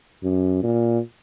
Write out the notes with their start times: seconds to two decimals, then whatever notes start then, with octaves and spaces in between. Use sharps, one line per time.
0.23 F#2
0.63 A#2